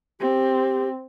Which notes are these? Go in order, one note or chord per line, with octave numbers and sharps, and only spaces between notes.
C4 G4